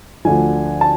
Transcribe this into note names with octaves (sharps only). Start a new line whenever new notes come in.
D2 D3 F3 G#5
A5